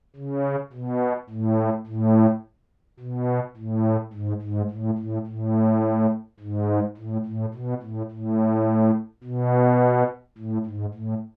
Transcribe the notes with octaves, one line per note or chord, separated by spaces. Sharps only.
C#3
B2
A2
A2
B2
A2
G#2
G#2
A2
A2
A2
G#2
A2
A2
B2
A2
A2
B2
A2
G#2
A2